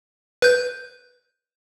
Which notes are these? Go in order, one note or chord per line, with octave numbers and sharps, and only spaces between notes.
B4 G6